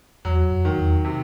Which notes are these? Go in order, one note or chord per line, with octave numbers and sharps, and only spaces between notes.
E2 F#3
F2
D#3
E2
C3